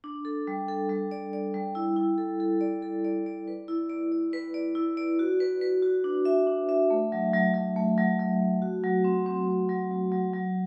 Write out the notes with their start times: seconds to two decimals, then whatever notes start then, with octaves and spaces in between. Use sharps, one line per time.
0.04 D4
0.25 A4
0.47 G3
0.68 A4
0.90 G3
1.11 D5
1.33 D5
1.54 G3
1.75 E4
1.96 E4
2.18 A4
2.40 A4
2.61 D5
2.82 A4
3.05 D5
3.26 D5
3.48 B4
3.68 E4
3.90 D5
4.12 D5
4.33 B4
4.54 D5
4.75 E4
4.97 D5
5.19 F#4
5.40 B4
5.61 B4
5.82 F#4
6.04 D4
6.25 E5
6.47 D4
6.69 E5
6.90 A3
7.12 F#3
7.33 F#3
7.54 F#3
7.76 A3
7.98 F#3
8.20 F#3
8.40 A3
8.62 F#4
8.84 F#3
9.04 C4
9.26 C4
9.47 C4
9.69 F#3
9.91 F#3
10.12 F#3
10.33 F#3